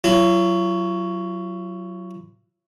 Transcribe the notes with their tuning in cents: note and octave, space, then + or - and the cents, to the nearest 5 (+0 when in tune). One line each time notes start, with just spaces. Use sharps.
F#3 +5 F4 -45